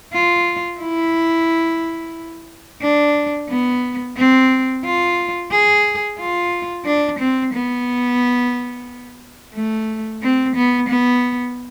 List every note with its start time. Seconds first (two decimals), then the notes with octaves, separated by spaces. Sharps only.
0.13 F4
0.81 E4
2.82 D4
3.49 B3
4.17 C4
4.85 F4
5.52 G#4
6.19 F4
6.86 D4
7.19 C4
7.54 B3
9.55 A3
10.23 C4
10.55 B3
10.89 B3